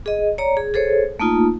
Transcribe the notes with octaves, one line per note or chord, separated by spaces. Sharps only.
G#4 D#5
C#5 D5 A#5
G#4
G#4 A4 C5 C#5
A3 A#3 D#4 F4